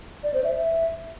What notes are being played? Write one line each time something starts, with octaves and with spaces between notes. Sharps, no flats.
D5
C5
E5
E5